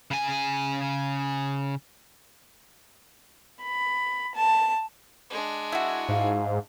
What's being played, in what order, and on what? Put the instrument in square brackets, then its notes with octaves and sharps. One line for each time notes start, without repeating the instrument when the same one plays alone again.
[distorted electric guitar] C#3 G#5
[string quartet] B5
A5
[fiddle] G#3 D4
[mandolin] E4 F#4
[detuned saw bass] G#2 [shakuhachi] F5